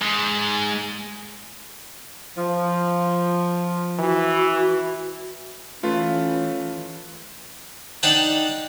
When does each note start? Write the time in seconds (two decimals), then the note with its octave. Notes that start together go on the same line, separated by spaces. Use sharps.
0.02 G#2
2.37 F3
3.99 E3 F#4
5.83 E3 A3 C#4 F4 B4
8.03 D4 D#4 F#5 G5 A5